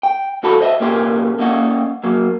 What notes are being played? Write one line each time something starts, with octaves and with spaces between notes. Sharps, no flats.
G5
C#2 F#4 A4 B5
C5 D#5 E5
C2 A#2 A#3 C#4 G4 C6
A#3 C#4 D#5 F#5
F#3 A#3